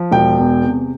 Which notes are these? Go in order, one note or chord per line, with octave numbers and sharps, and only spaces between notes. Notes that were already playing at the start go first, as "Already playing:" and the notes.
Already playing: F3
E1 G5
E2
C3